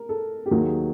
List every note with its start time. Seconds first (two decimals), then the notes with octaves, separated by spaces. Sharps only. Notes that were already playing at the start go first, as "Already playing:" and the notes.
Already playing: A#4
0.09 A4
0.46 G4
0.51 D#2 D#3 F#3 G#4